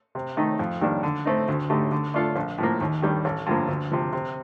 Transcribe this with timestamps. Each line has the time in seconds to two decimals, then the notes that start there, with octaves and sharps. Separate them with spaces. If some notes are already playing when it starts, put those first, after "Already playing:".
0.15 C3
0.37 D#3 A3 D#4
0.59 F2
0.81 D#3 G3 A#3 D4
1.03 D3
1.25 A3 C4 D#4
1.48 D2
1.70 D3 A3 D#4 G4
1.92 D3
2.14 A3 D4 F4 A4
2.36 A#1
2.58 A2 F3 A#3
2.81 D#2
3.02 D#3 G3 D4
3.25 A1
3.46 G2 D3 F3 A#3
3.68 D2
3.91 C3 F3
4.13 C3